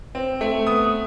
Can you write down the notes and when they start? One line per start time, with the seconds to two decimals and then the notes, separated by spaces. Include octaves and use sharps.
0.15 C4
0.41 A3
0.67 B3 D#6